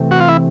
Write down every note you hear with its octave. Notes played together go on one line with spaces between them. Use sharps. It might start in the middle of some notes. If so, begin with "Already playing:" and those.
Already playing: C3 E3 A3 C4
F#4
F4
E4